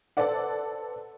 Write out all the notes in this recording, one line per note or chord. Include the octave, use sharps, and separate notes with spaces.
A4 B4 C5 D5 F#5